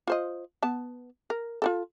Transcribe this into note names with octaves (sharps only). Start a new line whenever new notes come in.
F4 C5 D#5
B3 A5
A#4
F4 F#4 A4